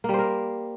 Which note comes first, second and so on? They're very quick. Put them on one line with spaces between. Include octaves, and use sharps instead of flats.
A#3 G3 C5 A#4